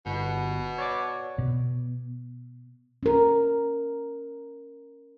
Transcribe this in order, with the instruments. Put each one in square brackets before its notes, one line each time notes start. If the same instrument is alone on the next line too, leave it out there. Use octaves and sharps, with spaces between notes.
[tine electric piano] G1 [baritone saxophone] B2
[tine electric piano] C#5 D5 D6
[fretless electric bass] B2
[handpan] C#4 A#4